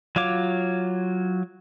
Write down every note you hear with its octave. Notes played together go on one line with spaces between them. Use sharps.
F#3 F4 C#5 D6